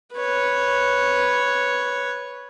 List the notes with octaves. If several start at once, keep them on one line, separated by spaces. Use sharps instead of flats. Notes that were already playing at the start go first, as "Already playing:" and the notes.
B4 C#5